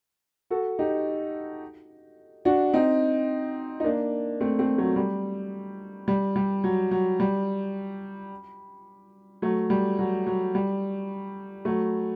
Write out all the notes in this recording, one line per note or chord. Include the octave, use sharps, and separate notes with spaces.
F#4 A4
D#4 G4
D4 F#4
C4 D#4
D#4
A#3 D4
A3 C4
A3 C4
F#3 A3
G3
G3
G3
F#3
F#3
G3
F#3 A3
G3
F#3
F#3
G3
F#3 A3